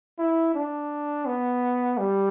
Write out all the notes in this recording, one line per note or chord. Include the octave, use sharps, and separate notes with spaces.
E4
D4
B3
G3